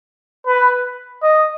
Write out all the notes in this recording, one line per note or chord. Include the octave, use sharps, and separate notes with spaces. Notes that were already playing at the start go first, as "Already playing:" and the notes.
B4
D#5